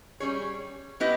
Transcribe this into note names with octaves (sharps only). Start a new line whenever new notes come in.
G3 C#4 G#4 C#5
B3 E4 G4 B4 D#5